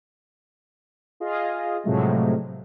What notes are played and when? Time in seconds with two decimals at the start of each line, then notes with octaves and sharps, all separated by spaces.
1.20 F4 G#4 D#5
1.84 A2 C3 F3 F#3 G#3 A3